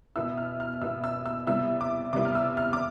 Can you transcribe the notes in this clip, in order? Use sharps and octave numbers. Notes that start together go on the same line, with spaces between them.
B2 B3 E4 E6
F6
F6
B2 B3 E4 E6
E6
E6
C3 G3 B3 E4 E6
D6
C3 G3 B3 E4 D6
F6
E6
F6
D6